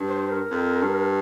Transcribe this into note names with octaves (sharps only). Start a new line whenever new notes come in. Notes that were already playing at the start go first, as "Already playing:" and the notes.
Already playing: G2
C5
A#4
F2
G2